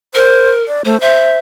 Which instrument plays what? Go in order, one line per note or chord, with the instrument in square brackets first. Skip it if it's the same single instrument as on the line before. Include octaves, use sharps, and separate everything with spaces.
[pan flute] A#4 [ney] C5
[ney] D5
[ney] A3 [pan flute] C5
[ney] C5 [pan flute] E5